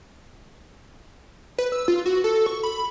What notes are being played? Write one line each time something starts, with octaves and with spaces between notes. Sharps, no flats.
B4
E6
F4
F#4
A4
C#6
B5